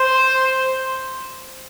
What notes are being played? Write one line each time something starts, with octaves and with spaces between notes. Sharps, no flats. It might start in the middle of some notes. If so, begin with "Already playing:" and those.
Already playing: C5